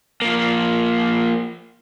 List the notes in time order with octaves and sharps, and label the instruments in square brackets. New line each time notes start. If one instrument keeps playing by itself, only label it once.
[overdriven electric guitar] F3 A#3